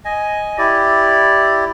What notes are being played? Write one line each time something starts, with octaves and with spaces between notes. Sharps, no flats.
D#5 G#5
E4 G4 D5